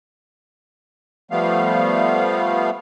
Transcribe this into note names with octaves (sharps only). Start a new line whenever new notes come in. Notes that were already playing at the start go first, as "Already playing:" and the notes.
F3 G3 A3 B3 F5